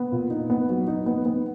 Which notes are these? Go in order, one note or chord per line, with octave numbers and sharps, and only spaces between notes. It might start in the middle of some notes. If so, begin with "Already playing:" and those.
Already playing: B3
A#2
D#4
B3
F#3
D#4
B3
B3